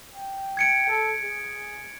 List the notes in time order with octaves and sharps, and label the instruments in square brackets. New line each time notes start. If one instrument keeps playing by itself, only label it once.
[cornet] G5
[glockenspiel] G#6 C#7 D7
[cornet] A4
G#4